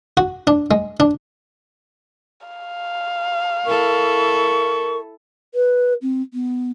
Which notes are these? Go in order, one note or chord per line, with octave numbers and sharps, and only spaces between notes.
F#4
D4
G#3
D4
F5
E4 A4 A#4 C#6
B4
C4
B3